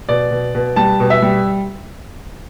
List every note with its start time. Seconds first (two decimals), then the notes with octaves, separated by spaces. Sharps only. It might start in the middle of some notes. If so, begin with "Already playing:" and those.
0.09 B2 D5
0.31 B2
0.55 B2
0.76 G3 A5
1.00 B2
1.10 E5
1.22 G3